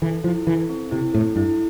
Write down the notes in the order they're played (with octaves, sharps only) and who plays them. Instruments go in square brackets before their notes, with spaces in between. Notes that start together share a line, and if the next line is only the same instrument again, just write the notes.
[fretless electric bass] E3 [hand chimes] A4
[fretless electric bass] F3 [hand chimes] E4
[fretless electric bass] E3 [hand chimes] A4
[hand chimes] C4
[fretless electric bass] C3 [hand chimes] E4
[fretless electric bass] A2 [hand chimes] A4
[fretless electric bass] G2 [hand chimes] E4